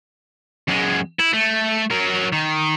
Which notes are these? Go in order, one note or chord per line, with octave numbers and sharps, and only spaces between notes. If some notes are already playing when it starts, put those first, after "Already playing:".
F#2 G#3
E4
A3
F#3 A#4
D#3